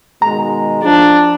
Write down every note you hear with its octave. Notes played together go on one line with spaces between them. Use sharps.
B2 D#3 G#3 A#5
F3 D4